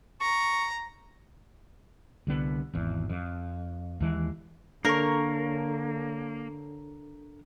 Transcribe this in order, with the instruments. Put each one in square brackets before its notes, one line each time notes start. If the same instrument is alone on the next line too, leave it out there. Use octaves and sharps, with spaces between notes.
[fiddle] A#5 [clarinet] C#6
[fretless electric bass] C2 D3 B3
G#1 E2
F2
D#2 E3 G#3
[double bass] D3 [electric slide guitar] A#3 [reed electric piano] D4 A4 [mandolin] A#4 C#5